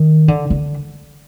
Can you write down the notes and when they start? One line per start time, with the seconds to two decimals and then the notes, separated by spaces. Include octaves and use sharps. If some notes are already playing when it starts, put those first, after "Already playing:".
Already playing: D#3
0.28 D3
0.50 D3